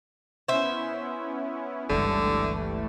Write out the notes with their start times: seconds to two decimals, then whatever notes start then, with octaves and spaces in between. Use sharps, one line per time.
0.48 B3 C#4 E4 C5 E5
1.90 G1 C#2 D3 E3 G3 A3